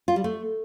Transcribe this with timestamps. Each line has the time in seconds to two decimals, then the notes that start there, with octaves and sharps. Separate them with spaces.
0.08 F4
0.16 G3
0.24 A3